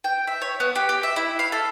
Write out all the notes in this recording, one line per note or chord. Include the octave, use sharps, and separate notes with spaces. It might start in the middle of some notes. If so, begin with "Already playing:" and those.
G5
E5
C#5
B3
G4
G4
E5
E4
F5
A4